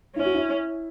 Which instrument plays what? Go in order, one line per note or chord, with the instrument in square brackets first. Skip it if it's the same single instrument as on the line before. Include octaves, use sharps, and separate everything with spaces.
[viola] C#4 [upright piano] E4
[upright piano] F#4
E4